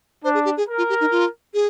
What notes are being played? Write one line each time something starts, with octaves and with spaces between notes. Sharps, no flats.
D4 C5
G#4
G4
G#4
A#4
F4
G4
D#4
F4
G#4